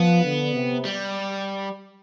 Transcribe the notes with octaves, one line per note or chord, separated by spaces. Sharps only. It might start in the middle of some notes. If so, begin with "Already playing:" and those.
Already playing: F3 B3
D3
C3
G3